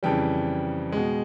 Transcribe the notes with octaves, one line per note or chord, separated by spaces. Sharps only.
F2 C#3 E3 G3 G5
B2 G#3